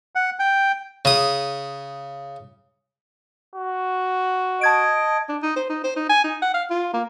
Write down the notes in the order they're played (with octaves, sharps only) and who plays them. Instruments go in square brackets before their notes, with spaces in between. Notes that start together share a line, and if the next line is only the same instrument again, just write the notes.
[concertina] F#5
G5
[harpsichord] C#3 D#6
[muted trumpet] F#4
[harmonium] D#5 [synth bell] A5 G#6 D7
[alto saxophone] D4
D#4
C5
D#4
C5
D#4
G#5
D#4
F#5
F5
F4
A#3